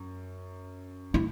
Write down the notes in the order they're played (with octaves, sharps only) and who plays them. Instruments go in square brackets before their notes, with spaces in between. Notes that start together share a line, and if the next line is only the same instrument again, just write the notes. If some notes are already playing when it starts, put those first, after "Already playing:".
Already playing: [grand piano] F#2
[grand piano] A2 [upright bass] E4